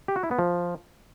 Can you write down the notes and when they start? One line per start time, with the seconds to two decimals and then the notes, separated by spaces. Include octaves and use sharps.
0.08 G4
0.16 F#4
0.23 E4
0.31 B3
0.39 F3